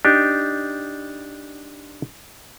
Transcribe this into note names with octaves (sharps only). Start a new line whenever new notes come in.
D4 D#4 G4